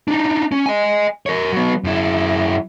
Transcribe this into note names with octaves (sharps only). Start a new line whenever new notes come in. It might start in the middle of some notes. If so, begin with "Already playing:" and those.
D4 D#4
C#4
D#5 G#5
A#4 C#5
F#3 B3
F#2 E4